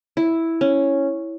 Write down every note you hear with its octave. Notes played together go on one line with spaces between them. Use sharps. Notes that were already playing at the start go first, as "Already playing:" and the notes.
E4
C#4